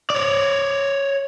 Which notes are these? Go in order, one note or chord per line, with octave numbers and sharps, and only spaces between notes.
C#5 D5